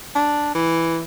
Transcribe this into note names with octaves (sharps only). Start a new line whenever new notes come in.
D4
E3